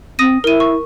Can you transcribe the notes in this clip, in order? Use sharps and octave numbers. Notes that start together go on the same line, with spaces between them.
C4 D#6 A#6 D#7
E4 A#4 D#7
C#6